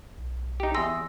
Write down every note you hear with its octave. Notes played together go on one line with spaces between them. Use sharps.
B1
D#4 G4
E2 G#4 C6 E6 A#6